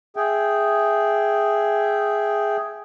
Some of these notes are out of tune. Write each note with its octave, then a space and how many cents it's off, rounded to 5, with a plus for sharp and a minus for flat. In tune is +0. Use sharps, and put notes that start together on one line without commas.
G#4 +0 E5 +0 G5 -10